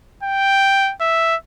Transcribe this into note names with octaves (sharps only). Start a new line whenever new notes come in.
G5
E5